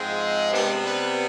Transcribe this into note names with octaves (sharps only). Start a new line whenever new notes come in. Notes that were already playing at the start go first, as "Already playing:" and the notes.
Already playing: G#2 F3 G#3 C4
C3 G3 B3 D4
B4